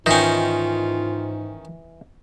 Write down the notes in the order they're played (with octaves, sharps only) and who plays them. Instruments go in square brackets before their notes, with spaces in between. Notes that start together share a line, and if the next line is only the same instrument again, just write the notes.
[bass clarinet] G#2 [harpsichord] D#3 C#4 [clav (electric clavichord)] E3 D#5 G5 [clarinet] F4